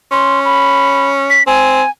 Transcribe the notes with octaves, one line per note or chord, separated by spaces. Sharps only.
C#4 C6
B5
B6
C4 G#5